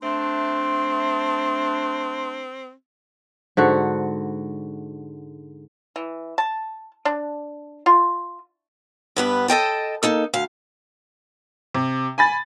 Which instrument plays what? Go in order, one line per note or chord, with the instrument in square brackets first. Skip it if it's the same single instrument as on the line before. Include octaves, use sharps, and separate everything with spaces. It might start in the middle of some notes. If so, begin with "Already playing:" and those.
[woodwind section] A3 D4 [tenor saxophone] C4 [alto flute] C6
[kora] G#2 D3 F#4
[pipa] E3
A5
D4
F4
[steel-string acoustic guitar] G2 B3 B4
A4 D#5 G5 A5
A#3 D#4 A4
D2 F5
[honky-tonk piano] C3
G#5 B5 A6